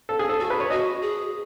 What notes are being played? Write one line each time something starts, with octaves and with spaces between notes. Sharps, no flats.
A4
G#4
A4
F#4 A4
B4
C#5
F#4 D#5
G#4